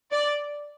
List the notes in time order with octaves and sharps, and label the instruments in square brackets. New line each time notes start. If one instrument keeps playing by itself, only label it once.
[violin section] D5